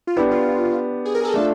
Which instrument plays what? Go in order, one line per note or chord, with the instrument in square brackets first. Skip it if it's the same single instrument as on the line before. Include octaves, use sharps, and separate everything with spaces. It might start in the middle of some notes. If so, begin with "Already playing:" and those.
[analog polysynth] F4
[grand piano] B3 D4 G4 [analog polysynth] E4
[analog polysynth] F4
G#4
A#4
A4
[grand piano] A3 D4 F4